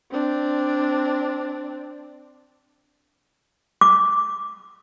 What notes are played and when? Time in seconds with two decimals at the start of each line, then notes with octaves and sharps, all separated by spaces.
0.11 C4 D4
3.81 D6